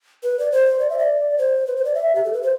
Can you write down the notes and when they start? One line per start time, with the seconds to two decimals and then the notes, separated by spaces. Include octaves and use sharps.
0.23 B4
0.39 D5
0.52 C5
0.80 D5
0.90 E5
0.99 D5
1.38 C5
1.67 B4
1.76 C5
1.85 D5
1.95 E5
2.15 G4
2.24 A4
2.33 B4
2.43 C5